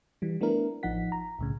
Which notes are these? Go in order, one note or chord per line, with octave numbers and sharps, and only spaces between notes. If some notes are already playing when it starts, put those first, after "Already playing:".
E3 G3
A3 B3 D4 E4 A#4
A1 F3 D#4 F#5 B6
A#5
C2 A2 C#3